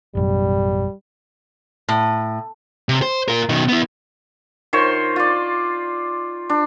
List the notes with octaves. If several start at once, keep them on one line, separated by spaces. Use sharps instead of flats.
A1 F#2 B2 G3
A2
C3
C5
F4 A#4
B2 D#3
B3 E4
D#3 F4 C5 C#5
F4 D5
D4